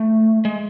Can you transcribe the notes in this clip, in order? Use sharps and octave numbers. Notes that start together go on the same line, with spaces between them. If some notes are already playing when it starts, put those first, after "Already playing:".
Already playing: A3
G#3